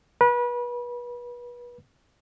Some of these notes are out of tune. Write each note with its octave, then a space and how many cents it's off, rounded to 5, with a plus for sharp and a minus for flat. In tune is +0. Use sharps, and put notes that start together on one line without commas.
B4 -30